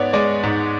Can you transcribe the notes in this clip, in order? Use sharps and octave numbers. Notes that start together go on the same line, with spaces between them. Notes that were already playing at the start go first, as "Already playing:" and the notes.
Already playing: G#2 B3 C#5 D5
G#3 D5
G#2